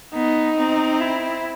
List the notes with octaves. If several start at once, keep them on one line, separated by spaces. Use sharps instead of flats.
B3 D#4
C4
E4